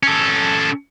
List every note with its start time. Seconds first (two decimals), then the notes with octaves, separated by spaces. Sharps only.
0.03 C#4 A4